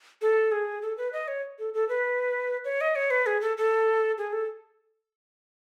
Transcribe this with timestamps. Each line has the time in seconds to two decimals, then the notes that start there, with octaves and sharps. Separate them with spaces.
0.22 A4
0.52 G#4
0.82 A4
0.98 B4
1.13 D#5
1.28 C#5
1.59 A4
1.74 A4
1.89 B4
2.65 C#5
2.81 D#5
2.96 C#5
3.11 B4
3.26 G#4
3.41 A4
3.57 A4
4.18 G#4
4.33 A4